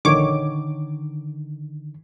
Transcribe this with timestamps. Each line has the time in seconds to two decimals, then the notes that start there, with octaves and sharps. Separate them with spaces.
0.05 A#1 D3 D#3 C#5 D6